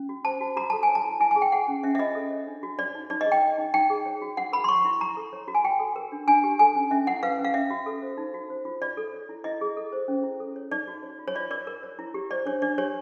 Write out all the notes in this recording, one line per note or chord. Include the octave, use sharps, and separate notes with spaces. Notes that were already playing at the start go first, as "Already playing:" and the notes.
Already playing: C#4
F#4
C5 A5
F#4
F#4 A#5
A4 A5
G#5
C#5
A5
E4
E4 G#5
G#5
G#4
G5
G#4 F#5
C#4
C#4 E5
E5
F4 D#5
A4
C#5
D4
F#4
C#5 D5
D#4
D#4 D5
D#5
G#4
G5
C#5
D#4
D#4 G5
G#4
C#5
F#4
F#4 F#5
A#4 B5
C6
C#5 C#6
E4
E4 A#5
A4
C#5
F#4
G#5
F#4 G5
A4
A#4
D4
D4 G#5
G4
A4 G#5
C#4
C#4 E5
E4 F#5
B4 F5
C#4
F5
C#4 E5
F#4
A4
C5
D#4
F#4
C5
F4
F4 D5
A4
C#5
E4
E4 D#5
G#4
A4
C5
C#4
E4
A4
C#5
D#4 D5
F#4
C#5
F4
C#5
F4 D5
A#4 D5
A#4
C#5
E4
G4
C5 D5
D4 C#5
D4 D5
G4 C#5